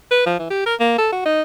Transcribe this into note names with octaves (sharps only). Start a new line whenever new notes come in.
B4
F3
E3
G4
A#4
A#3
A4
F#4
D#4